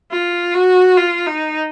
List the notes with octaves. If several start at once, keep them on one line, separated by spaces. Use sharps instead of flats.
F4
F#4
F4
D#4